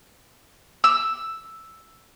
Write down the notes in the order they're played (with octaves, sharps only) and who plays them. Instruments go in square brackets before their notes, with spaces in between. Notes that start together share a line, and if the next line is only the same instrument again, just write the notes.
[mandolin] E6